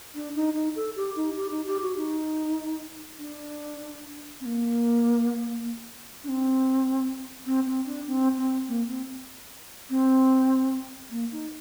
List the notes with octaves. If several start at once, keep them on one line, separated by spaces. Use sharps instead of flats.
D4
D#4
D#4
A4
G4
D#4
G4
D#4
G4
F#4
D#4
D4
C4
A#3
D4
C4
C4
C4
D4
C4
C4
A#3
C4
C4
A#3
D#4